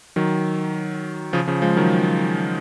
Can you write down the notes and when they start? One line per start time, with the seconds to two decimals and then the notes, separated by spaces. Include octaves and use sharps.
0.16 D#3 F#3
1.33 C#3 F3
1.47 C#3 F3
1.62 F3 G#3
1.77 D#3 F#3